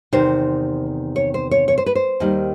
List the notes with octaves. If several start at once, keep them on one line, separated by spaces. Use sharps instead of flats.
E2 C3 D#3 C5
C#5
C5
C#5
C#5
C5
B4
C5
D#2 D#3 G3